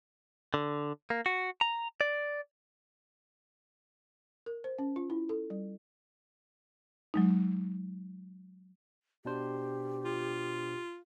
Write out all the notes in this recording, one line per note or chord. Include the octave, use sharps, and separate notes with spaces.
D3
A#3
F#4
A#5
D5
A#4
C5
C#4
F4
E4
A4
G3
F#3 G#3 D#4
B2 D4 G4 C5
F4